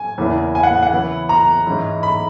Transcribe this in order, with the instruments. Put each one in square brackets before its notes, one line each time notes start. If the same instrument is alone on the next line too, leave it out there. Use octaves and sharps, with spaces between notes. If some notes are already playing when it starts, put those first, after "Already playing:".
Already playing: [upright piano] G#5
E2 C#3 E3 A#3 E4
G#5
F#5
F#5
C#3 E3 B3 E4
A#5
G#2 E3 G#3 C#4 E4
B5